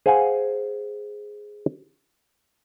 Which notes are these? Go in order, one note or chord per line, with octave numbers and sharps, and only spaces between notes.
G#4 C5 F5 F#5 G#5